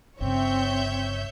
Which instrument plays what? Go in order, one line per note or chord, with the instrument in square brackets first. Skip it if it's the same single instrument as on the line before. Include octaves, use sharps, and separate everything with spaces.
[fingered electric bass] G1 G2 C#3 [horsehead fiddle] C4 [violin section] C#5 E5 G6